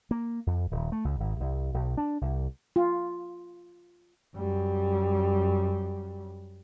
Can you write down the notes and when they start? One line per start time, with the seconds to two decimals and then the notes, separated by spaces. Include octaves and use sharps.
0.11 A#3
0.47 F2
0.71 D#1
0.92 A3
1.05 C#2
1.20 G#1
1.40 C2
1.74 B1
1.97 D4
2.21 C2
2.76 F4
4.36 F#2 G3